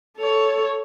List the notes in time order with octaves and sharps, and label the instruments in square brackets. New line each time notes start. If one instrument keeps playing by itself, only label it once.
[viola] A4 C#5